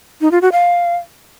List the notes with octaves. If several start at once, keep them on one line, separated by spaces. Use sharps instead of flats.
D#4
F4
F#4
F5